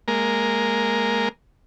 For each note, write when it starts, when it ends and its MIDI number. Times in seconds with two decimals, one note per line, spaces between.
0.08 1.29 56
0.08 1.29 58
0.08 1.29 70